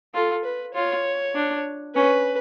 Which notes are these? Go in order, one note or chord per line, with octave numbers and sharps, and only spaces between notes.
F4 A4
B4
F4 C#5
D4
C#4 B4